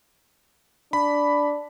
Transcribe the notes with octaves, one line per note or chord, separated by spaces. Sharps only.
D4 B5